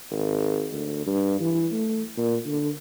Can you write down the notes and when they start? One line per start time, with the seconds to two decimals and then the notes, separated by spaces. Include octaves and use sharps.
0.11 G#1
0.73 D2
1.06 G2
1.41 E3
1.72 A3
2.18 A#2
2.46 D3